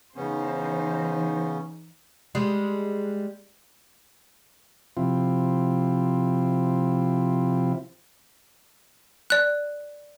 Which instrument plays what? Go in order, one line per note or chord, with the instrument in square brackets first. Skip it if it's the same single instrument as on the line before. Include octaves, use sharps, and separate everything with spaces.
[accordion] C#3 B3 C#4 [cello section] E3 D#4 C5
[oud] G3 G#3
[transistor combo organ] C3 F3 C4 E4 F4
[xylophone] D5 F#6